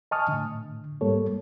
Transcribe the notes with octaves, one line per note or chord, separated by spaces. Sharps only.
D#5 G#5 A5 C#6 D#6 F6
A2 D3
G#2 G3 A#3 A4 C#5